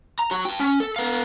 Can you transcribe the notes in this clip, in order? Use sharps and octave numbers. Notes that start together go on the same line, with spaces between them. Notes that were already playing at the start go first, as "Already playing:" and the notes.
A#5
F#4 C#5
G5 A5
C#4
A4
B3 F5